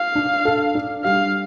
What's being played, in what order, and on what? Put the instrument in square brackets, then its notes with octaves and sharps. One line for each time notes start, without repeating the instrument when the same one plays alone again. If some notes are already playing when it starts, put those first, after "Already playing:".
Already playing: [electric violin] F5
[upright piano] D4
A4
D4
[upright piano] G3 [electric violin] F5